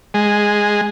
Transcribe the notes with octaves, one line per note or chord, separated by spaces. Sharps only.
G#3